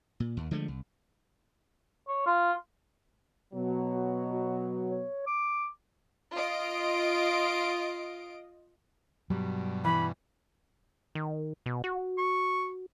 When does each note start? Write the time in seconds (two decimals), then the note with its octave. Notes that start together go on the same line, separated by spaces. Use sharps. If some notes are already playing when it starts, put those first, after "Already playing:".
0.20 A#2
0.37 D#2
0.51 D3 F3 G#3 A3
0.68 C2
2.08 C#5
2.26 F4
3.54 B2 F#3
3.91 F#4
4.33 F#4
4.91 C#5
5.27 D6
6.34 F4 D#5 D7
9.30 G2 B2 F#3 G3
9.85 E3 B5
11.15 D#3
11.66 B2
11.84 F#4
12.18 C#6